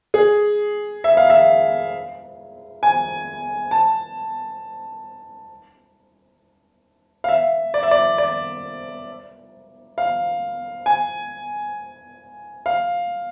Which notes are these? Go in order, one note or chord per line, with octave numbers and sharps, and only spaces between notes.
G#4
E5
F5
E5
G#5
A5
F5
E5
D5
E5
D5
D5
F5
G#5
F5